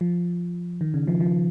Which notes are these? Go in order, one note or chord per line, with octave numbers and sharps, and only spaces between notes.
F3
D#3
C#3
F3
F3